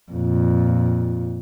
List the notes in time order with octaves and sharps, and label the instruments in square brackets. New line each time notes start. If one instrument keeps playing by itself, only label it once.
[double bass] F2 A#2